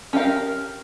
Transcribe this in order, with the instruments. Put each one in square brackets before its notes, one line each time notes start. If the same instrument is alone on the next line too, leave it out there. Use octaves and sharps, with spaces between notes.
[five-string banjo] C#4 G4 A#4 F5